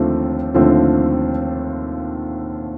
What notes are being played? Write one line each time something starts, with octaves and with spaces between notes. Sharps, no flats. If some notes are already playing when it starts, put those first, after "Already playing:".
Already playing: D#2 D3 F3 A3 C4
D#2 D3 F3 A3 C4